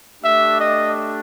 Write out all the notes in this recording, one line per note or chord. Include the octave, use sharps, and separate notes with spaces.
A3 D4 G4 E5
D#5